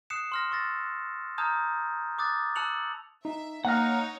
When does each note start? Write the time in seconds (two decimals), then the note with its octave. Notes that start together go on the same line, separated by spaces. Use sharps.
0.10 D#6 F#6 C7 C#7 E7
0.32 C6 F6 A#6
0.51 C#6 E6 A6 A#6
1.38 A5 A#5 D#6 F6 G6 G#6
2.18 D6 D#6 F#6 A6
2.56 A5 E6 F#6 C#7 F7 F#7
3.25 D#4 E5
3.65 A#3 D#4 C#5 F#5 A#5 F6 F#6 A#6